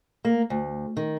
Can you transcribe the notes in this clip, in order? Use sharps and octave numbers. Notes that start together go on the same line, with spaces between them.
A#3
D2
D#3